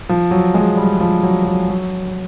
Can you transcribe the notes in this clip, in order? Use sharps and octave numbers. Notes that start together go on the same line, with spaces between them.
F3
F#3
G#3
G3
F3
F#3
F#3
F#3